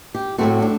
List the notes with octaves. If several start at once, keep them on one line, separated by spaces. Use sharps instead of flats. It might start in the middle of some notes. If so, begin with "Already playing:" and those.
G4
A2 A3 C4 F#4
D4